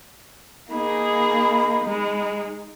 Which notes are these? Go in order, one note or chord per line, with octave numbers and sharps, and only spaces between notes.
A#3 D#4 G#4 B5
G#3